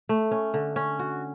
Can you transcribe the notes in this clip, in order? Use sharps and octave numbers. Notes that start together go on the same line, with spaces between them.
A3
C#4
D3
C#4
F#4